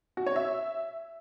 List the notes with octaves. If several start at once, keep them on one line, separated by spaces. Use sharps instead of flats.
F#4
C#5
E5